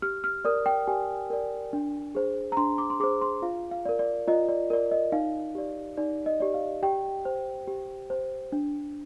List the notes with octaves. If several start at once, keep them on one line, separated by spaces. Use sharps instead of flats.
G4 F6
F6
A#4 D5 D#6
G5
G4 G#5
A#4 D5
D4
G#4 C5
A#5
D4 C6
D6
C6
G#4 C5 D6
C6
F4 F5
F5
A#4 D5
D5
F4 D#5
D5
A#4 D5
D#5
D#4 F5
G4 D5
D#4 D5
D#5
G4 D5
F5
G4 G5
C5
G4
C5
D4